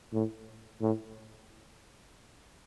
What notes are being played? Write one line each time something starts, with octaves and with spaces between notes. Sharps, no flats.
A2
A2